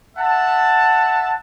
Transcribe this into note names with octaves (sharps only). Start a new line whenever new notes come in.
E5 F#5 A5